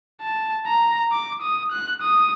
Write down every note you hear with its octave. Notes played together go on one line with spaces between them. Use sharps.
A5
A#5
D6
D#6
F#6
D#6